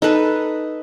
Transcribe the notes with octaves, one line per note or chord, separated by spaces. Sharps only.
D#4 A4 B4 A5